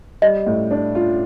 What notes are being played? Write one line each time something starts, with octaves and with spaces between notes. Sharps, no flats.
G3 D#5
A2
D4
F4